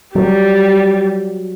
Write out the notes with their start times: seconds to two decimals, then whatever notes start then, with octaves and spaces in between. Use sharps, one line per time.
0.15 F#3 G3